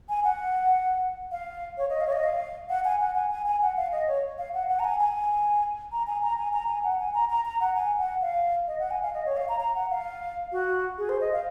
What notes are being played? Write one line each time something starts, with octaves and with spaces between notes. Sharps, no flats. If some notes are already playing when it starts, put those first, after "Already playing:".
G#5
F#5
F5
C#5
D#5
F5
C#5
D#5
F5
F#5
G#5
F#5
G#5
G#5
G#5
F#5
F5
D#5
C#5
F5
F#5
F#5
A#5
G#5
G#5
A#5
G#5
A#5
G#5
A#5
G#5
F#5
G#5
A#5
A#5
A#5
F#5
G#5
F#5
F5
D#5
F#5
G#5
F5
D#5
C#5
F5
A#5
A#5
F#5
F5
F#4
G#4
C5
D#5
F5